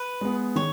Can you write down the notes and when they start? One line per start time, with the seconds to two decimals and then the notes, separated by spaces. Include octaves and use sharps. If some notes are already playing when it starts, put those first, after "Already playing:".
Already playing: B4
0.21 G#3 B3
0.56 D#3 C#5